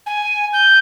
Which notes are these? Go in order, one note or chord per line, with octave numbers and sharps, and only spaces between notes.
G#5
G6